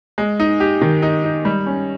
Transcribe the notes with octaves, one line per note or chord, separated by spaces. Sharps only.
G#3
D#4
G4
D#3
D#4
D#4
G3
C#4